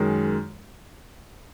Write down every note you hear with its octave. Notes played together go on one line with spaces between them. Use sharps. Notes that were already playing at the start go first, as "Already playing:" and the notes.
Already playing: F#2 D#3 G#3